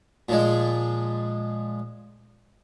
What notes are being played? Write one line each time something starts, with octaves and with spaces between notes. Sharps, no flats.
A#2 F3 G#3